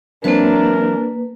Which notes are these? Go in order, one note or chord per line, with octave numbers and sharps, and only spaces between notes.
E3 F#3 A#3 C4 D4 A#4 B4